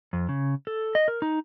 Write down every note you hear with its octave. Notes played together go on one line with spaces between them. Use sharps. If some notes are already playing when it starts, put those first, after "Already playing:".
F2
C#3
A4
D#5
A#4
D#4